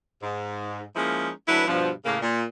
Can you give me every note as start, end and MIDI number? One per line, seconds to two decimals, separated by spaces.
0.22 0.81 44
0.95 1.30 53
0.95 1.30 56
0.95 1.30 58
0.95 1.30 61
0.95 1.30 63
0.95 1.30 64
1.47 1.65 38
1.47 1.65 54
1.47 1.65 62
1.47 1.65 64
1.47 1.65 71
1.66 1.91 43
1.66 1.91 47
1.66 1.91 53
2.05 2.17 45
2.05 2.17 49
2.05 2.17 58
2.21 2.43 46